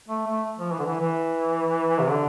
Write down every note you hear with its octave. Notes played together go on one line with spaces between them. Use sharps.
A3
A3
F3
E3
D3
E3
E3
C3
D3